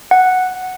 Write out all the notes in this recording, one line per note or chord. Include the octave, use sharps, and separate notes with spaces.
F#5